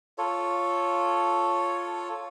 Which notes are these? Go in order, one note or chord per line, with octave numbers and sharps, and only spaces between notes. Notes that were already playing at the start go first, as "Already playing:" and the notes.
F4 A4 C#5